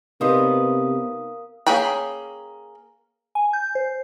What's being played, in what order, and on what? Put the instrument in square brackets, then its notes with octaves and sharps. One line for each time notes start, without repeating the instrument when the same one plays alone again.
[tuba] C3 [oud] B3 D#4 C5 [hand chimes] A#4 F5 D#6
[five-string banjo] A#3 C#4 G#4 G5 B5
[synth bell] G#5
G6
C5